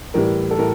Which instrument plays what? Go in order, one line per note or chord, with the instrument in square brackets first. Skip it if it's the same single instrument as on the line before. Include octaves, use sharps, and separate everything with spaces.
[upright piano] A2 E3 G3 A#4
A4
A2 A#4